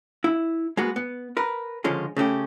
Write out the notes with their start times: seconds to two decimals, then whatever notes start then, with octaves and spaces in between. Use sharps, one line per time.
0.24 E4
0.77 G#3 A#3 B3 F#4
0.96 B3
1.37 A#4 B4
1.84 C#2 D3 F3 G#3 C#4
2.17 C#3 A3 C#4 G4